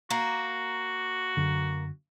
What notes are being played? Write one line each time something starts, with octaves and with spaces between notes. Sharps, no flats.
A#3 F#4
F#2 D3